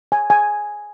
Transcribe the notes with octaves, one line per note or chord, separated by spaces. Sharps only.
G#5
G#5